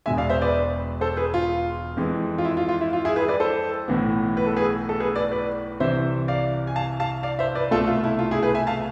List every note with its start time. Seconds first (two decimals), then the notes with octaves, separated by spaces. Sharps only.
0.06 E1 E2 B2 G#3 E5 G#5
0.17 D5 F5
0.29 C5 E5
0.41 B4 D5
1.01 A4 C5
1.17 G#4 B4
1.34 F4
1.97 F2 E3 G#3
2.38 F4
2.45 E4
2.57 F4
2.69 F4
2.81 E4
2.93 F4
3.05 E4 G#4
3.16 G#4 B4
3.28 B4 D5
3.40 A4 C5
3.88 B1 A2 E3 B3
4.37 B4
4.47 A4
4.56 G#4 B4
4.89 A4
5.00 G#4 B4
5.16 B4 D5
5.32 B4 D5
5.80 C2 C3 E3 C5 E5
6.28 D5 F5
6.67 G#5
6.76 F5 A5
7.00 F5 A5
7.23 D5 F5
7.39 C5 E5
7.55 B4 D5
7.71 C2 B2 A3 F4 A4
7.87 F4
8.04 E4
8.19 F4
8.31 E4 G#4
8.43 G#4 B4
8.54 E5 G#5
8.67 F5 A5